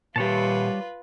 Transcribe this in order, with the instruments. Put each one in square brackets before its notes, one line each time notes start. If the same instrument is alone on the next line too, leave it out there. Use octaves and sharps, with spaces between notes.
[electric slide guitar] A#2 G4 [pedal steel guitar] G3 C#5 A5 [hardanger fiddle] F4 B4